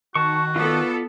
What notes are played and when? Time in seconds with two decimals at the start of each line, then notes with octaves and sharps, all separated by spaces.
0.15 D#3 F#4 A5 C#6
0.56 B3 F4 A4 D5